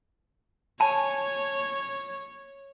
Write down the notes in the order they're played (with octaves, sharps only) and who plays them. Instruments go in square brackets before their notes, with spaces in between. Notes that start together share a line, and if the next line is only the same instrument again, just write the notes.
[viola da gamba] C#5 [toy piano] G#5 A5